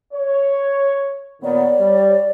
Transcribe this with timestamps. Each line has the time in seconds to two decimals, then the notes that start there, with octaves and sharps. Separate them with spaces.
0.13 C#5
1.42 A#2 D#3 B3 C#5 D5
1.79 G3